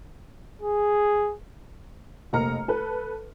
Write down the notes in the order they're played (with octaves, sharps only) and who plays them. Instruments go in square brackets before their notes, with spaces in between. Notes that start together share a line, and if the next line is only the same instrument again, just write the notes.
[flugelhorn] G#4
[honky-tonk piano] F1 A#3 D#5 A#5 F6 C#7
A4 B4